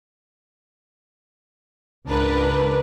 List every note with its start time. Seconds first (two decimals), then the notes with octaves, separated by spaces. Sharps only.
2.07 C#2 G#2 D4 A#4 B4